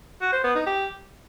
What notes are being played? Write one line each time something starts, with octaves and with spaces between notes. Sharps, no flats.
F#4
C5
B3
D#4
G4